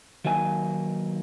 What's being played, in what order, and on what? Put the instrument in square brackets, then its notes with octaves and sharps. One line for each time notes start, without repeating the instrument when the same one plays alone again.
[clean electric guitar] D#3 F#3 A#3 D#4 G#5